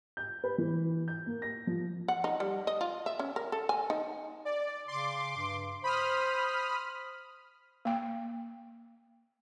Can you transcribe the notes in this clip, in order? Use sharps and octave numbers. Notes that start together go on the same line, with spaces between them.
G6
B4
E3
G6
A#3
A#6
F3
F#5
D#4
G3
D#5
F4
E5
C#4
A#4
A4
G#5
D#4
D5
C#3 C6 D6
G2
C5 B5 D#6 F6
A#3 G5